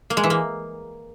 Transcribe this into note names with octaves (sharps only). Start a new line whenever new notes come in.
A#3
G#3
E3
A#3